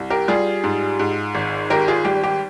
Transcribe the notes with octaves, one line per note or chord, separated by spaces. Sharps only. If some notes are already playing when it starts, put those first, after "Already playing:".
Already playing: C2
G4 A#4
G3 F4 G#4
G#2
G#2
G#1
G#1 G4 A#4
F4 G#4
G3 G4
G4